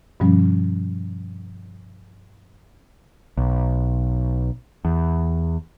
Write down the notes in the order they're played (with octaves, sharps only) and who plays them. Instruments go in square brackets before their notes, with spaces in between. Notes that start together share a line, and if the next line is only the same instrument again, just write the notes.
[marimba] G2 B2 F3 G3 C#4
[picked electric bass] B1
E2